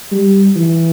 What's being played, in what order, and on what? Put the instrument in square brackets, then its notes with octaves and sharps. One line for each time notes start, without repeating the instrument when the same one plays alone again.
[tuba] G3
E3